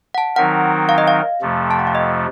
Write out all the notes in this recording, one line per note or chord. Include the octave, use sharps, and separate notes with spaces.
F#5
A5
D#3 F#3 C4 D#4 A#4 F#5
F5
D#5
F5
F2 C3 F3 A3
A5
F#5
F5
D#5